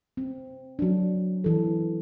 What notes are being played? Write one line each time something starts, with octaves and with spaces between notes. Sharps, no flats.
C4
F#3 D4
E3 A4